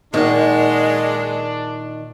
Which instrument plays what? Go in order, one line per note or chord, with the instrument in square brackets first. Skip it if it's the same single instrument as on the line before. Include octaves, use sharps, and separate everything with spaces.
[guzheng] A#2 [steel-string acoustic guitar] D#3 F#5 [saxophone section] G#3 [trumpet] D4